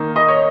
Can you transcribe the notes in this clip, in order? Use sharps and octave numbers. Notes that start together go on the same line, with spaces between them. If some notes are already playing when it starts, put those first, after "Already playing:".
Already playing: D#3 A#3 D#4
D#5
C#5